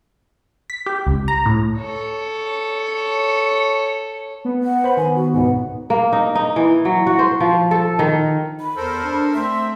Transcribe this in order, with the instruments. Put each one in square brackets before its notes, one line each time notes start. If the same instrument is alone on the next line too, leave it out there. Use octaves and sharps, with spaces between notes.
[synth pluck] B6
G4
C#2
A#5
A2
[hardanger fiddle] A4 C#5
[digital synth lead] B3
[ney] F#5
[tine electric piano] C5 B5
[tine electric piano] D#3 [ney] G#5
[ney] F#4
[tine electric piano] C#2 G#2 B2 [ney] F#5
[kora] A#3
D#4
D#4
E3
F#3
F#4
C5
F3
A4
D#3
[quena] B5
[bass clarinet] E2 [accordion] A4 A#4 C5
[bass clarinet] D4
[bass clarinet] A3 [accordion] C4 E5 [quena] C6